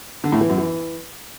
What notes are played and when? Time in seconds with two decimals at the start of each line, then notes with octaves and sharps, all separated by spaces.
0.24 D3
0.32 A2
0.41 E3
0.49 F#2
0.58 E3